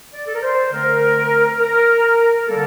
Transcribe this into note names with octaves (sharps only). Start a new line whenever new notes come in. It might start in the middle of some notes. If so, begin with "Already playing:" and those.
D5
A4
A#4
C5
D3 A3 C4 A#4
A#4
D3 G3 A#3 A4